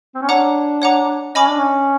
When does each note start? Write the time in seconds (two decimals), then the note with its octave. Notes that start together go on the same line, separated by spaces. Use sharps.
0.15 C4
0.22 C#4
0.29 D4 C#5 F#5 A#5 D6
0.82 C#5 F#5 A#5 D6
1.35 C#4 D#5 G#5 B5 D6
1.48 D4
1.60 C#4